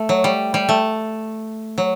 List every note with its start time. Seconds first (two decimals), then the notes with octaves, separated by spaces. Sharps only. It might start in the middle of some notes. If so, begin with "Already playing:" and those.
Already playing: A3
0.09 F#3
0.24 G3
0.54 G3
0.69 A3
1.78 F#3